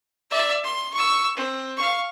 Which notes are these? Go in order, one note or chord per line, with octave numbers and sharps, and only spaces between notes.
D5 E5
C6
C#6 E6
C4
F5 C#6